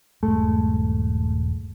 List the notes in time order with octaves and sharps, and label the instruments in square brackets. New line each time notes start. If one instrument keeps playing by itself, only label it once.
[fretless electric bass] D#1 G2 G#3 [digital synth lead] A3